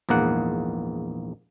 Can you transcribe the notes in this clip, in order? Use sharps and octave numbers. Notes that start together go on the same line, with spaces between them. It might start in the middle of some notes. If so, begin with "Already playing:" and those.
A#1 E2 G#2 A#3 F#5